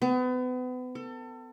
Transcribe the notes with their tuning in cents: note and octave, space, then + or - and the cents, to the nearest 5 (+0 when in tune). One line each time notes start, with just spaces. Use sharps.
B3 +35
A4 +30